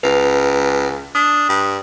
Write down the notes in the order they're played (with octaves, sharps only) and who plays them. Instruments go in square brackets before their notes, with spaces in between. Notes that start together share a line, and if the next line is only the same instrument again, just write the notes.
[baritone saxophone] C#2 [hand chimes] B4
[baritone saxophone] D4 [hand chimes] D#6
[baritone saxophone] G2